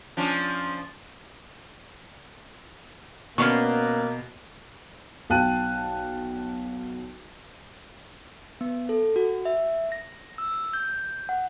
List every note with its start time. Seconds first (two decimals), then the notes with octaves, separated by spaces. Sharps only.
0.17 F3 C#4 D4
3.38 B2 A#3 B3 C#4 D4 C6 C#6
5.30 B1 F5 G5 A5 F#6 D#7
8.61 B3
8.89 A4
9.16 F#4
9.45 E5
9.92 A#6
10.38 E6
10.73 G6
11.29 F#5